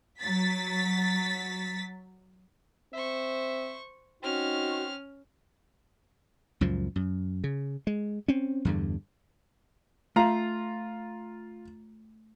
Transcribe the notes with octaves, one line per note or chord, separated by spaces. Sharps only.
F#3 A6 B6
C4 C5 E5 C#6
C4 C#4 D#4 F#4 F6
C#2 F#2 A#2 F3
F#2
C#3
G#3
C4 C#4
E2 G2 D3
A3 F4 F5 A#5